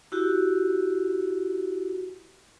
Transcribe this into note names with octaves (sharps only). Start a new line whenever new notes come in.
E4 F#4 G4